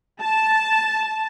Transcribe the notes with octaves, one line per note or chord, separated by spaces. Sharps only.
A5